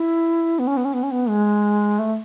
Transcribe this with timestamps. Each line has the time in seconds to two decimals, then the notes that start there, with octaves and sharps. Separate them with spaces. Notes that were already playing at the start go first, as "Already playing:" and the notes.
Already playing: E4
0.59 B3
0.67 C#4
0.77 B3
0.85 C#4
0.94 B3
1.03 C#4
1.11 B3
1.29 G#3
1.99 A3